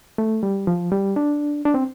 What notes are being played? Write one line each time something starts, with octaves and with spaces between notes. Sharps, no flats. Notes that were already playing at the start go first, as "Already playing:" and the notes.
A3
G3
F3
G3
D4
D4
C4